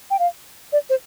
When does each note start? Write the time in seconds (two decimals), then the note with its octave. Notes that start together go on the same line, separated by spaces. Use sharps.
0.11 G5
0.19 F5
0.73 D5
0.90 C5